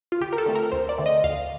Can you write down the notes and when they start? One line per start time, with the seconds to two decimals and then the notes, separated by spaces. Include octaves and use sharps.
0.12 F4
0.21 D2 G4
0.33 A#4
0.38 A4
0.46 D3 A3 C4
0.55 A#4
0.72 D2 C5
0.89 D5
0.98 D3 A3 C4
1.06 D#5
1.24 D2 F5